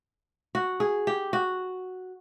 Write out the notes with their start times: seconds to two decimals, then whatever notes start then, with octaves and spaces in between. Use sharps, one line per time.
0.55 F#4
0.80 G#4
1.07 G4
1.33 F#4